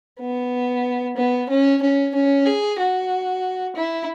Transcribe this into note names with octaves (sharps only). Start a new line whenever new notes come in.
B3
B3
C#4
C#4
C#4
G#4
F#4
E4